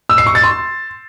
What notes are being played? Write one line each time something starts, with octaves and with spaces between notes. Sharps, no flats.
E6
C7
C#6
A6
C6